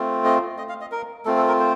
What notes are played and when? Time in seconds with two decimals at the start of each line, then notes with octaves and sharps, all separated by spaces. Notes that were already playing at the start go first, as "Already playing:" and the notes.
Already playing: A3 C4 F4
0.25 D#5
0.58 D#5
0.69 F5
0.81 D#5
0.92 A#4
1.25 A3 C4 F4 A4
1.37 A4
1.48 A#4
1.60 C5